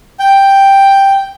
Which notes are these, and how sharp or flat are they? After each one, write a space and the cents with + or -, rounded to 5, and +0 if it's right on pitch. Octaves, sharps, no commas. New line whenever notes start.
G5 +0